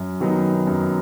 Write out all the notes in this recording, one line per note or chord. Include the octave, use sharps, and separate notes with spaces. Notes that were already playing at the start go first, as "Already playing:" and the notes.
Already playing: F#2
D#3 F#3 B3 D#4
F#2